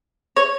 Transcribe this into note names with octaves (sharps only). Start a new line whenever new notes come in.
C#5